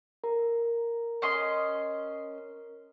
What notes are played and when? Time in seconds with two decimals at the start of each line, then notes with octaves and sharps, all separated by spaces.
0.24 A#4 A#5
1.22 C#4 D#5 C6